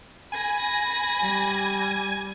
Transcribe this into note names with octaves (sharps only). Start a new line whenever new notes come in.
G#5 B5 A#6
G3